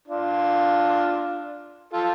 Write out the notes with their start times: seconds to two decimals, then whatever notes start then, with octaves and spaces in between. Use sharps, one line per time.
0.08 D4 F4
1.93 F4 A4